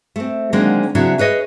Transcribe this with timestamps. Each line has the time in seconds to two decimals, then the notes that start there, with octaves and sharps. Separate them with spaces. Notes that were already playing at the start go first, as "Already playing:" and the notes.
0.16 A3 C4
0.53 D3 D#3 F#3 G#3 A#3 C4
0.95 C#3 F#3 C4 D4 E4
1.18 G#4 B4 C#5 D#5